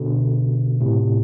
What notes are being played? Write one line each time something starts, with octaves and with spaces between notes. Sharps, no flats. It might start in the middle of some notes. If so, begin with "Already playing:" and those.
Already playing: B2 D3
A2 C3